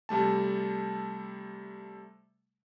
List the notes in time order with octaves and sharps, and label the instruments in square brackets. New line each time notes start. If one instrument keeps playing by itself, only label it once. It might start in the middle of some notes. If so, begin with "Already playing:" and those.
[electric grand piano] C3 G3 A3 A5